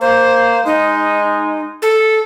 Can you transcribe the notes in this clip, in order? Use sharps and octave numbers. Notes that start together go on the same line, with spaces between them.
A#3 C5
G#3 D#4
A4